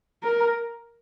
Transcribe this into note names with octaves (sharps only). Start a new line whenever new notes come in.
A#4